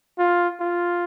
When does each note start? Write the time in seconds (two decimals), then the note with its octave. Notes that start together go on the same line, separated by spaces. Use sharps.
0.19 F4
0.60 F4